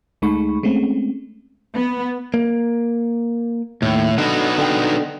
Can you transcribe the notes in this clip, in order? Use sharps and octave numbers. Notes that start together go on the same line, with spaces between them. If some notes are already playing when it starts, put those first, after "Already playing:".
D2 G#3 A3 D#4 B5 C#6
G#3 A3 C4 C#4
B3
A#3
D#2 A2
D3 B3 D#4 F#4
D3 G5